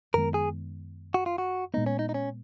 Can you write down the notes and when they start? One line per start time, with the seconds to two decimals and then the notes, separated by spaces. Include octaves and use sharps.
0.14 F#2 D#3 G#3 B3 A#4
0.34 G#4
1.14 F#4
1.26 F4
1.38 F#4
1.74 A#2 G#3 B3 D#4
1.86 C#4
1.99 D#4
2.09 D#4
2.14 C#4